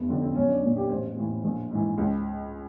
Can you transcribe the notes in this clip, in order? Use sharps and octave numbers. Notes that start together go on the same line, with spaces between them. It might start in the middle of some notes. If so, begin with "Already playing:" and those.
Already playing: F1 B3
F2 D3 C4
C4
B1 C#4
D4
A#2
G4
A1 C5
A2 E3
A#1
G#2 E3
C#2